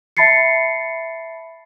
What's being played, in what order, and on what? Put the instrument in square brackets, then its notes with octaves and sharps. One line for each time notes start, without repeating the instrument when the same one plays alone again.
[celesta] E5 A5 B5 A6 C7 C#7